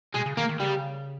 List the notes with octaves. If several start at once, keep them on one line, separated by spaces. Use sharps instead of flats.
B2 G#3
C#3
D#3 A#3
D#3
C#3 G3